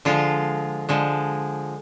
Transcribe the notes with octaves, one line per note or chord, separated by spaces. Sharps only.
D3 F3 G#3 F4
D3 F3 G#3